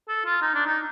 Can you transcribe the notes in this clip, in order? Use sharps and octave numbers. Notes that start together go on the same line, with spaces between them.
A4
F4
D#4
D4
D#4